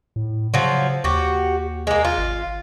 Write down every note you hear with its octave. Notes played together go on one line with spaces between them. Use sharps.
A2
C#3 F3 F#3
D#2 F#4 G4
G#3 A#3
F4
G#1